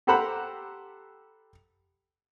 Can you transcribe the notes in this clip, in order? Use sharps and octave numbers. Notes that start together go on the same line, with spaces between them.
G4 A4 C5 F#5 A#5 B5